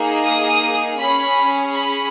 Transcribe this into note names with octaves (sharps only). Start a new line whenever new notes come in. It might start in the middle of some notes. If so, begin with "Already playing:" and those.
Already playing: A#3 D#4 G#4
D#6
C#4 G#4 B5
B5